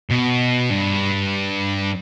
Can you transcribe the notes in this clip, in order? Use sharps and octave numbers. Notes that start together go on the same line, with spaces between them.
B2
G2